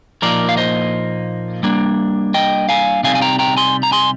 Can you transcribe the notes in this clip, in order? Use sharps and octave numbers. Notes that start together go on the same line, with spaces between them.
A#2 F3 A#3 D#4 A#4 D5
F5
C5 D#5
G3 A#3 D4
D#5 G5
F5 G#5
C3 G3 C4 D#4 F5 G#5
G#5
G5 A#5
G5 A#5
G#5 C6
A#5
G#5 C6